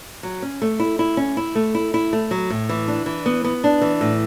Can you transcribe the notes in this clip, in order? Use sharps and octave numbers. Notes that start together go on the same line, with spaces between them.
F#3
C#4
A3
E4
E4
C#4
E4
A3
E4
E4
A3
F#3
A2
E3
D4
E3
B3
B3
D4
E3
A2